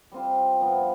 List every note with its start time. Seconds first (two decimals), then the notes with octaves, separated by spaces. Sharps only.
0.12 G3 C4 F4 C5
0.61 G2 F3 B3